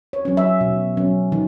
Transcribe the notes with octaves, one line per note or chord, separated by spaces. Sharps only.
C#5
F#3 C#4
E5
B2
F#3 C#4
D#3